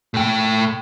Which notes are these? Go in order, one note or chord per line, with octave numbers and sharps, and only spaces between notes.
A2 G5